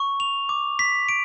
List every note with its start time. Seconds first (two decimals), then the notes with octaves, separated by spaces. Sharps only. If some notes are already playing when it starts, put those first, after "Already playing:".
Already playing: C#6
0.20 F7
0.49 D6
0.79 B6
1.09 D7